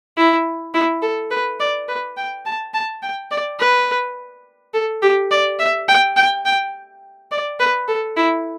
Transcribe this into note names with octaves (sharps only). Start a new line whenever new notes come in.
E4
E4
A4
B4
D5
B4
G5
A5
A5
G5
D5
B4
A4
G4
D5
E5
G5
G5
G5
D5
B4
A4
E4